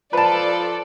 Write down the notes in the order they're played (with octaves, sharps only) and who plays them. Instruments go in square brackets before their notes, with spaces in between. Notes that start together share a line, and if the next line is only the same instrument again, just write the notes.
[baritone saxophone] F3 [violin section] A4 D5 [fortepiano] B4 A5